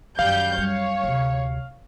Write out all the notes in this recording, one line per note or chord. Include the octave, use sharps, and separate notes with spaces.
F#2 D#3 G3 F5 G6
G3 C#5
D2 C3